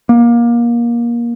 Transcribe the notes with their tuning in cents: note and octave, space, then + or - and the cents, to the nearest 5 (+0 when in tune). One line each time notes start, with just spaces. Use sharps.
A#3 +20